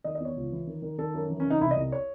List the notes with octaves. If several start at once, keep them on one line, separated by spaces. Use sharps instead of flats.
D#3 D#5
D#5
E2 C#5
C#2
E3
D#3
D#3
D#3 A4
F#2
E3
C#4
C#3
D#4
C2 E4
D#5
C2
C#5